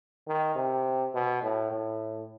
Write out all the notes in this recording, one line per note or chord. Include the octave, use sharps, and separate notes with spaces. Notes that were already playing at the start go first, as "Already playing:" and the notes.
D#3
C3
B2
A2
A2